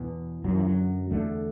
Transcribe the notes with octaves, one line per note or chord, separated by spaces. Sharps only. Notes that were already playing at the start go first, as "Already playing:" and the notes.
Already playing: E2 B2 E3
F#2 D3 F#3
E3
F#3
E2 D3 A3